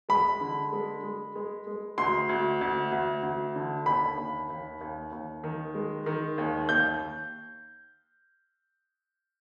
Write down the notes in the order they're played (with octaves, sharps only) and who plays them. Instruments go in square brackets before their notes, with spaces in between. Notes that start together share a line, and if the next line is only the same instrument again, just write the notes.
[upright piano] G#3 [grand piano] B5
[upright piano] D3
G#3
G#3
G#3
G#3
[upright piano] D2 [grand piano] C6
[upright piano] D2
D2
D2
D2
D3
[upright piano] D#2 [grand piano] B5
[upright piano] D#2
D#2
D#2
D#2
D#3
G#3
D#3
D#2
[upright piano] D#2 [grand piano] G6